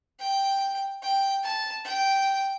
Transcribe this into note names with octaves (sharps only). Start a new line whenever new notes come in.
G5
G5
A5
G5